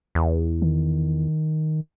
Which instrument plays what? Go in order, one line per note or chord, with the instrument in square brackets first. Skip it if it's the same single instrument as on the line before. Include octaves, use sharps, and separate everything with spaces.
[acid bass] E2
[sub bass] D#3